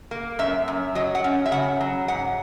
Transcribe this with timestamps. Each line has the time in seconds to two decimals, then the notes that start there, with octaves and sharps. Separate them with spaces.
0.11 A#3
0.39 F#2 E5
0.68 F#2
0.95 F#3 D#5
1.15 F#5
1.24 C#4
1.46 E5
1.52 C#3 F#5
1.81 F#3
2.08 G#2 F#5